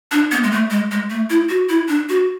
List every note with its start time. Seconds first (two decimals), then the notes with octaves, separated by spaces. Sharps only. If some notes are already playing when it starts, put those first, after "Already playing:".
0.12 D4
0.32 B3
0.44 G#3
0.51 A3
0.70 G#3
0.91 G#3
1.10 A3
1.30 E4
1.49 F#4
1.69 E4
1.88 D4
2.09 F#4